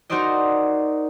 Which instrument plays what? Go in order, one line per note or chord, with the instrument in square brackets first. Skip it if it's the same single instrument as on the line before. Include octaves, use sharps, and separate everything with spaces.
[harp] D#4 F#4 A#4 C5 D5 D#5